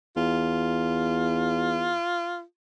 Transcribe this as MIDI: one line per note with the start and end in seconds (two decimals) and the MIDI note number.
0.17 1.94 40
0.17 2.42 65